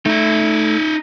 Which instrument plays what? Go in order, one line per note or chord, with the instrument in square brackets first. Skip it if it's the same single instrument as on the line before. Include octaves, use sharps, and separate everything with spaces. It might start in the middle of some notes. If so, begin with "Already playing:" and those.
[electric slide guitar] A3 [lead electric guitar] D#4 E5